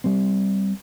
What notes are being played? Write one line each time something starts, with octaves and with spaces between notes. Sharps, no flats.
G3 C4